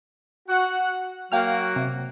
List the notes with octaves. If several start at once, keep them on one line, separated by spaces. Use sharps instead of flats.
F#4 F#5
F#3 A#3 F#4 F5 G5 F6
C3